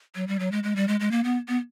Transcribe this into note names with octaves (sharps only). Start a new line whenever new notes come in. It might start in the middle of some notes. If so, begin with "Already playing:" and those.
F#3
G3
F#3
G#3
G#3
G3
G#3
G#3
A#3
B3
B3